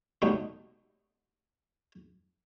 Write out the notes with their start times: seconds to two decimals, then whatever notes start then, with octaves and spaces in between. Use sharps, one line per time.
0.22 B2 G3 A3 B3 C#4 D#4